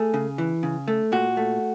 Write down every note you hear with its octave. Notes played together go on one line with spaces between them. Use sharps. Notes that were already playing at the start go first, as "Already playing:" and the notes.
Already playing: A3 G#4
C#3
E3
C#3
A3
A#2 F#4
A3